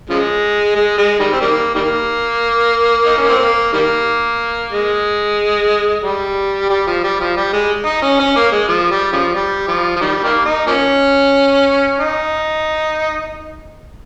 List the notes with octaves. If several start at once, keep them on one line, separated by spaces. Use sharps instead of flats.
C#3 F3 G#3
G#3
G#3
D#3 G3
C4
D#3 G3 A#3
D#3 G3 A#3
D#4
C#4
C4
A#3
D#3 G3 A#3
G#3
G3
G3
F3
G3
F3
G3
G#3
D#4
C#4
C#4
A#3
G#3
F3
G3
C#3 F3
G3
F3
F3
D#3 G3
D#3 G3 A#3
D#4
F3 A#3 C#4
D#4